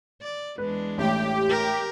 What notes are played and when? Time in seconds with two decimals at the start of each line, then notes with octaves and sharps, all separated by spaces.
0.22 D5
0.58 E2 G#3 D4 B4
0.98 A1 A2 G4
1.49 A#4